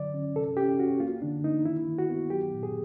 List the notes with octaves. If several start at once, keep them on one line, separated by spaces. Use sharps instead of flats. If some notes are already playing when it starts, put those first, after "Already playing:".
Already playing: D3 F#3 D5
C#4
C3 A4
C#4 G4
C#4 F#4
A#3 F4
D3 D4
A#3 D#4
D#3 E4
D#3
F#4
B3
F#3 G4
A#2
G#4